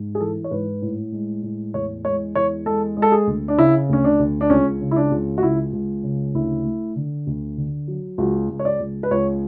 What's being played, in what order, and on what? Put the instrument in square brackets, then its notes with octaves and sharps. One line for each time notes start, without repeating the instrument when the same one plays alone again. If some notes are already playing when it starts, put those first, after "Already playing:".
Already playing: [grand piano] G#2
G#4
E3 A4
C#5
G#2 B4
A2
G#3
A2
E2 C#5
G#3 C#5
E2 C#5
G#3 A4
G#3
A4
G#4
D2
D4
C#3 E4
D2 C#4
D4
D2
D4
C#2 C#4
C#3
E4
D4
C#2
F#4
C#2 E4
C#2
C#3
D2 E4
A3
D3
D2
D3
F#3
C#2 F#4
C#2
C#5
D5
C#2
B4
C#2 C#5